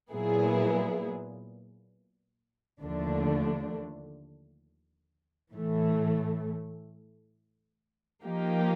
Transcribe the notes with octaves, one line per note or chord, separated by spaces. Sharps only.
A#2 F#3 B3 E4 G#4
D#2 D3 F3 A3 D4
A2 E3 A3
F3 A#3 D#4 G4